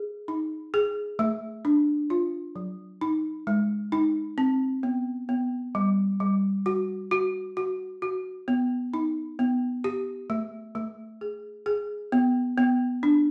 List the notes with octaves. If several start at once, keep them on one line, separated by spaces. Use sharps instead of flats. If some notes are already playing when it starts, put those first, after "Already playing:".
Already playing: G#4
D#4
G#4
A3
D4
F4
F#3
D#4
G#3
D#4
C4
B3
B3
G3
G3
F#4
F#4
F#4
F#4
B3
D#4
B3
G4
A3
A3
G#4
G#4
B3
B3
D4